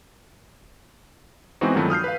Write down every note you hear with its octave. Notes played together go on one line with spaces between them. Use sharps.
E3 G#3 B3 C4 D#4 F#4
G2 D#3 F3 F#3 A3 E4
D#6 F6 G6 C7
B4 F5